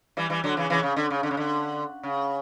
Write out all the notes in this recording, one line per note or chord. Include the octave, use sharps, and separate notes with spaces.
E3 G3
E3 G3
D3 F#3
C#3 E3
C#3 E3
C#3
D3
C#3
D3
C#3
D3
C#3